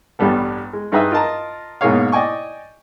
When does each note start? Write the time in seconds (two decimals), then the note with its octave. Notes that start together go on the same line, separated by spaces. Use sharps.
0.19 A1 G2 G3 B3 A4
0.73 G#3
0.92 G2 D#4 G#4 B4 D#5 E5
1.12 F4 A#4 D#5 A5 A#5
1.81 G#2 B2 A#3 G#4 C#5 F5
2.12 D5 D#5 G5 G#5 C#6